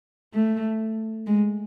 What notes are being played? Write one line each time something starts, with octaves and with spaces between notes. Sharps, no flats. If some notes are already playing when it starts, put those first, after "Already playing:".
A3
G#3